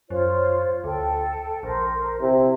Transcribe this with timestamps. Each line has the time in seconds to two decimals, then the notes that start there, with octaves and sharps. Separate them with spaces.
0.10 F#2 F4 C5 C#5
0.84 D2 A4 G5
1.63 A#1 A#4 C5
2.21 C3 E4